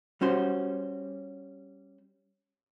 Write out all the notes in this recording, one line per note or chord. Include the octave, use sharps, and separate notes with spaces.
G3 C#4 F#4 C5